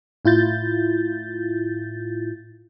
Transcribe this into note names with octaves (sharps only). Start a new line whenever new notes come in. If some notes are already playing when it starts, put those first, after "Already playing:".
A2 E4 F4 G6 A6